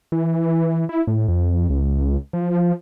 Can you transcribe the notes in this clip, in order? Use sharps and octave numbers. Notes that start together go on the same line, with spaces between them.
E3
E4
A2
F2
C#2
F3